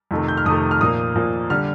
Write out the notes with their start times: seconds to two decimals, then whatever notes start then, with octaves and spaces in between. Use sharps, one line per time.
0.11 F2 C3 D#3 A3
0.28 G6
0.37 F6
0.45 F2 C3 D#3 A3 D#6
0.71 F6
0.81 A#2 F3 A#3 D#6
1.16 A#2 F3 A#3
1.50 D3 G3 F6